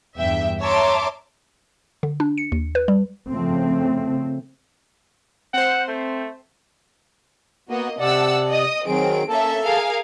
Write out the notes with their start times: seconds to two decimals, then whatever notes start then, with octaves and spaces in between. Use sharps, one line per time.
0.19 E2 G2 E5 G5
0.61 C#5 E5 A5 A#5 C6 D6
2.03 D3
2.20 D4
2.38 C#7
2.52 D#2
2.75 B4
2.88 G3
3.30 C#3 F3 A3 C4
5.54 C4 C5 F#5
5.88 A3
7.69 A#3 B3 F#4 D#5
7.99 C3 D5 F#5 A5 E6
8.49 D#5 D#6
8.87 D#3 F#3 C4 G#4 D7
9.29 A#3 C#4 A4 E5 A5
9.64 G#4 A#4 F5